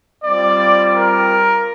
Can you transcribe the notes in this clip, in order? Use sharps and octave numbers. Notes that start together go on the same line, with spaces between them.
G3 C4 F4 D5
A#4